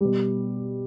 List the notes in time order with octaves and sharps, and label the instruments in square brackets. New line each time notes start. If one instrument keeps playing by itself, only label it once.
[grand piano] B2 G3